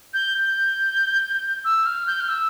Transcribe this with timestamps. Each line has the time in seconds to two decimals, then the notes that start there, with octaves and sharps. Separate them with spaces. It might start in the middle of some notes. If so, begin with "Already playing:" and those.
0.14 G6
0.38 G6
1.65 E6
1.86 F6
2.07 G6
2.20 F6
2.29 E6